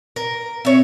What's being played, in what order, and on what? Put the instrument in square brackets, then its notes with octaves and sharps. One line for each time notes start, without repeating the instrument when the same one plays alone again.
[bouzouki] A#4
[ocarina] C4 [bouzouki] C#5 E5